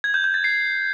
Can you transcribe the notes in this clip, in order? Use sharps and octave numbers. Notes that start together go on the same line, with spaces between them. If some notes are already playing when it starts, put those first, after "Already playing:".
G#6
G6
G6
A6
C7